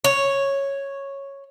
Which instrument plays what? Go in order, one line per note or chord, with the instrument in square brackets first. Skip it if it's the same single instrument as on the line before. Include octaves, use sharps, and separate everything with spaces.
[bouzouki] C#5